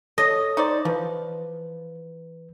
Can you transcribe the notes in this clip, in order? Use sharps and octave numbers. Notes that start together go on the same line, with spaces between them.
A4 C#5 D#5
D#4 C5 D5
E3 F3 B4